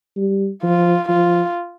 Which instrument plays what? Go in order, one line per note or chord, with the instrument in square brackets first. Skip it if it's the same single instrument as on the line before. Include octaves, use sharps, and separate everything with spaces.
[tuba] G3
[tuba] F3 [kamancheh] F4
[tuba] F3 [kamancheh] F4